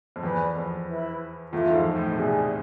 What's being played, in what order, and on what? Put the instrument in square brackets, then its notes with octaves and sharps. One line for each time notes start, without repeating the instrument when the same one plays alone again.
[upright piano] F2
[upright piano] E2 [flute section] B4 D5 G#5 B5
[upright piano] F2
[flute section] E4 B4 E5 B5
[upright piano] E2 [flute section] F4 A4 E5
[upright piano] G#2
F2
A2
C3
[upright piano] B2 [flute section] G#4 D5 G#5